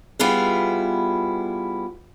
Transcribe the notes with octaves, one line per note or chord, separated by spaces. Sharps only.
G3 B3 E4 F4 G#4